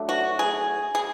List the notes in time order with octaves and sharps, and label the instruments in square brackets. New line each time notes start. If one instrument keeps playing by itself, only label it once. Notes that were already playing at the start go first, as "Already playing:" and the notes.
Already playing: [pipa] F#3 A3 D4
F#4
G#4
G#4